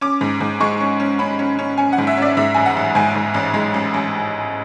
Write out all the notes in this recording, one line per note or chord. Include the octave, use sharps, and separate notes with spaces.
C#4 D6
G#2
G#2
G#3 C#6
C#4
C#4
C#4 B5
C#4
C#4
C#4 G#5
F#5
G#2
E5
C#4 D5
G#2 E5
A1 G#5
F#5
A1
G#2 G#5
G#2
A1
G#3
A1
A1